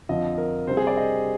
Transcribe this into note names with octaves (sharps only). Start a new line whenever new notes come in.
F2 D3 F3 D#5
A#4
C3 G3 C4 C5
G#4
D5
D#5